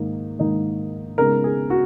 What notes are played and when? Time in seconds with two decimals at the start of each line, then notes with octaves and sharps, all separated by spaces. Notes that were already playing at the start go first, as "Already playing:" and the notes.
Already playing: G#2 D#3 A#3 D#4
0.39 G#2 D#3 A#3 D#4
1.18 C#3 G#3 B3 D#4 A#4
1.44 G#4
1.70 F#4